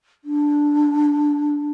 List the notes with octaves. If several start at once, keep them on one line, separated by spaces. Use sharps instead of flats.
D4